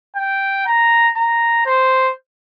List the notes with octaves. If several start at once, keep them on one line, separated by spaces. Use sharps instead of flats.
G5
A#5
A#5
C5